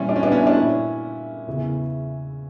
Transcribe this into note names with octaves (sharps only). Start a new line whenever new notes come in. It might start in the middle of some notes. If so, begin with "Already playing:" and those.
Already playing: A#2 E3 G3 C#4 E4
D4
C#4
B3 D4
C#4 E4
D4
A#2 C#4 E4
E2 C#3 E3